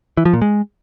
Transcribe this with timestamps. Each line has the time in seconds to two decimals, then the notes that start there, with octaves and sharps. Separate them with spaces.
0.17 E3
0.25 F3
0.34 A#2
0.42 G#3